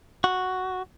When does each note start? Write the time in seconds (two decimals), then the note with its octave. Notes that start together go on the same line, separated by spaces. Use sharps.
0.24 F#4